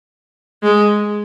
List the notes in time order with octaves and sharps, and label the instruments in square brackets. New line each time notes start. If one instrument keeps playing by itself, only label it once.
[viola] G#3